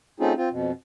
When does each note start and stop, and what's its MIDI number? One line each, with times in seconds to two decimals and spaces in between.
0.20 0.33 57
0.20 0.33 60
0.20 0.33 61
0.20 0.33 63
0.20 0.33 65
0.20 0.33 68
0.37 0.49 60
0.37 0.49 65
0.51 0.72 41
0.51 0.72 47